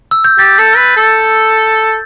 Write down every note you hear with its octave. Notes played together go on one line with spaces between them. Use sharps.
E6
G6
G4 A6
A4
B4
A4